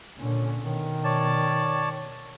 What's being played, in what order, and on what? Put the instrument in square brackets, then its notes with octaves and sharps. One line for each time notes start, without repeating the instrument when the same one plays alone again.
[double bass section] A#2 D3 C#4
[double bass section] B2 [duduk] D#3
[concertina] C#5 D5 A5